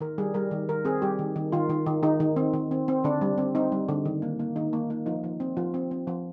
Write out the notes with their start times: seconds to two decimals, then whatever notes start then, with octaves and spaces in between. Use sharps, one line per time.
0.01 D#3 A#4
0.18 G3 G#4
0.34 G3 A#4
0.51 D#3
0.69 D#3 A#4
0.85 C4 G#4
1.02 G3 G4
1.19 D#3
1.36 D#3
1.52 D#3 F4
1.70 D#3
1.86 D#3
2.03 D#3 D#4
2.20 D#3
2.36 C4
2.54 D#3
2.71 C4
2.88 C4
3.04 D3 D4
3.21 G3
3.38 C4
3.55 C4 D#4
3.72 G3
3.89 D3
4.05 D#3
4.22 A#3
4.39 A#3
4.56 D#3 D#4
4.73 A#3
4.90 A#3
5.06 F3 D#4
5.24 F3
5.40 C4
5.57 F3 F4
5.74 C4
5.91 C4
6.07 F3